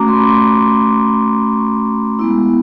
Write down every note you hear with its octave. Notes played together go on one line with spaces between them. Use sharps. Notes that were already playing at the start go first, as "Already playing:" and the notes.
Already playing: A3 C#4 F#4 A#5 D6
C6
B5
C#6
G#3 B3 E4